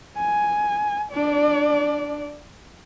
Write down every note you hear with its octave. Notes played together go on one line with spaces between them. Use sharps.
G#5
D4 D5